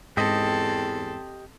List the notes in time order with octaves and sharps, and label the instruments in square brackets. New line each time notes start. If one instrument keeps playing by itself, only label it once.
[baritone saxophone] E2 [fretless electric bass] G#2 [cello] C4 A4 [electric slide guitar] G4 D#5